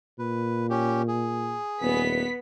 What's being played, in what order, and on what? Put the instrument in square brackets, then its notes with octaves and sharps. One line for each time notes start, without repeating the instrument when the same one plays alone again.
[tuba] A#2 [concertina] B4
[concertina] C#4 G4
G#4
[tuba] D#1 [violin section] B3 B6